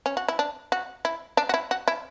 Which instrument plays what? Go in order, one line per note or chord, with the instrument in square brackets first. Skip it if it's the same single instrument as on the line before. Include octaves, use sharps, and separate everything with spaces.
[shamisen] C#4
F#4
E4
D4
F#4
E4
D4
F#4
E4
F#4
E4